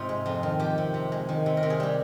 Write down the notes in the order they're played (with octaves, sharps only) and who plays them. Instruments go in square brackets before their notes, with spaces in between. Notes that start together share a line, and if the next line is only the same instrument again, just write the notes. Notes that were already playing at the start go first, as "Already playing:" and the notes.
Already playing: [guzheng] G#2 C3 D#4 F4
G#3
F2 F4
D#3
F3 G4
C3
C3
G#3
D#3
C3
A#4
C3
G#4
G3 G4